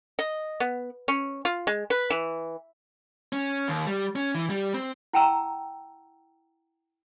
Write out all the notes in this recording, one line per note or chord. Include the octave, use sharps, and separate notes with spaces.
D#5
B3
C#4
F4
G#3
B4
E3
C#4
D#2
G3
C#4
E3
G3
C4
E4 F#5 G5 A5 A#5 E6